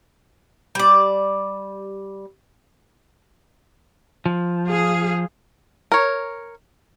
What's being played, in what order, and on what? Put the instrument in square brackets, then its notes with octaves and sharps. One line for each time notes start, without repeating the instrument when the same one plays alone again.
[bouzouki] G3 D5
[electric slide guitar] F3
[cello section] G#4 F5
[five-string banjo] A#4 C#5